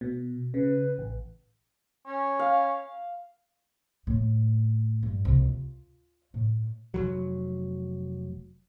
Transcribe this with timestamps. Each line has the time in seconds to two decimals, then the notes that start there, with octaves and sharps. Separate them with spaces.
0.01 B2
0.54 C#3 B4
0.98 A1
2.06 C#4
2.39 F5
4.07 A2
5.03 G2
5.25 C2
5.45 F4
6.34 A2
6.94 F1 C2 F#3